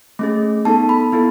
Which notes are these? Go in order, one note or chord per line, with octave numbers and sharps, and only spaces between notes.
A3 C#4 G#4
B3 D#4 A4 A5
B5
B3 E4 A4